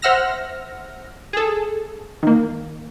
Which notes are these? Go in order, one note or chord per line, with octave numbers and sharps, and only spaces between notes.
C5 E5 F#5 E6 F6 A#6
G#4 A4
D#3 A#3